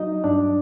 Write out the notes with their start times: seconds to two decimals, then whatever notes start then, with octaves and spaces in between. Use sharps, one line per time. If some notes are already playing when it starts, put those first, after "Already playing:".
Already playing: F#3 D#4 D#5
0.24 G2 D4 D5